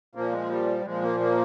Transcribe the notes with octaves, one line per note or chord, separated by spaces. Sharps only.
A#2 F3 A#3
G#3
G3
A#2 F3 G#3
A#3
A#3